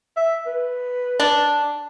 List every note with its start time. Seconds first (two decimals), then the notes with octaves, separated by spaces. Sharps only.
0.17 E5
0.47 B4
1.20 D4